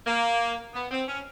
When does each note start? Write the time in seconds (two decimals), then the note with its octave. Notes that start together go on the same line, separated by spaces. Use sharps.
0.07 A#3
0.74 B3
0.91 C4
1.07 C#4